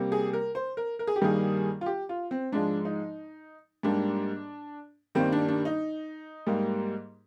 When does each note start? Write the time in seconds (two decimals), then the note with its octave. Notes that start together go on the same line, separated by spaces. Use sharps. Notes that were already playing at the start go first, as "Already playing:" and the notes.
Already playing: C3 G3 A#3
0.12 G#4
0.33 A#4
0.55 C5
0.77 A#4
0.99 A#4
1.07 G#4
1.16 G4
1.22 G2 D#3 G3 A#3 G#4
1.81 F4
1.86 G4
2.09 F4
2.31 C4
2.52 G#2 F3 G#3 D4
2.85 D#4
3.83 G#2 G3 A#3 D4
5.15 G2 D#3 G3 A#3 C4
5.32 D4
5.48 D4
5.65 D#4
6.47 G#2 G3 A#3